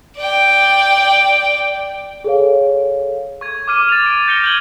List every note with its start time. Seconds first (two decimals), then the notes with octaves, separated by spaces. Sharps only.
0.17 D5 G5
2.24 G#4 A4 C#5 F5
3.41 C#6 G#6
3.68 D6 F6 D#7
3.89 A6 F7
4.06 D7
4.28 G6 A#6 C#7 F7 G7
4.43 G6 G#6 D#7 F#7 G7